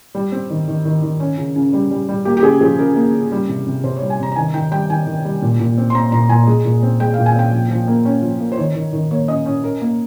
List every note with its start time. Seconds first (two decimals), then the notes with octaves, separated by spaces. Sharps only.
0.15 G3
0.32 C4
0.50 D#3
0.68 D#3
0.85 D#3
1.03 D#3
1.20 C#4
1.38 C#3
1.56 C#3
1.73 G3
1.91 G3
2.09 G3
2.25 A#3 G4
2.37 G4
2.43 C#3 G#4
2.61 F3 G#4
2.79 C#3 A#4
2.96 A#3
3.13 C#3
3.32 G3
3.49 C3
3.67 C3
3.84 C3 C5
3.97 C#5
4.02 G3
4.10 G#5
4.20 C3 A#5
4.32 A#5
4.36 D#3 G#5
4.54 D#3 G5
4.72 G3 G5
4.89 D#3 G#5
5.07 D#3
5.25 G3
5.42 A#2
5.60 A#2
5.78 C4
5.90 C6
5.94 C4 A#5
6.12 A#2 A#5
6.29 A#2 G#5
6.47 G#3
6.65 A#2
6.83 C4
7.00 G#3 G5
7.14 F5
7.18 A#2
7.26 G#5
7.35 C4 G5
7.52 F3
7.70 F3
7.88 A#3
8.05 C#4
8.22 F3
8.40 A#3
8.52 C5
8.57 D#3 C#5
8.75 D#3
8.93 D#3
9.11 A#3 C#5
9.28 C#4 D#5
9.46 C#4
9.64 C#4 A#4
9.81 A#3